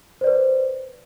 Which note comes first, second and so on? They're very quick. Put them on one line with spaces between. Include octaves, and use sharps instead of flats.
C5 D5 B4